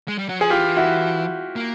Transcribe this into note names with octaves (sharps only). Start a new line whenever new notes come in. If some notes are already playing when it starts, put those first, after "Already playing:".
G#3
G3
F#3
F3 G#4
E3 F4 G4
E4 F#4
A#3